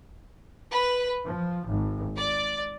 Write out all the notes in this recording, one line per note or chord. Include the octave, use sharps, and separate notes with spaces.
B4
F3
G#1
D5